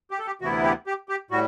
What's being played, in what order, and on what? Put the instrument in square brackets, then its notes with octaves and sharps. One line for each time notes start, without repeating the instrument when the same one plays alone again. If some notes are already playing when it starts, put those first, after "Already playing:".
[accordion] G4
A4
G4
D2 C3 E3 B3 E4 F#4
G4
G4
G4
A2 G3 F#4